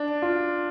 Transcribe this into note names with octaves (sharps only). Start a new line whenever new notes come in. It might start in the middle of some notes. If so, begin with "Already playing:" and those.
Already playing: D4
F4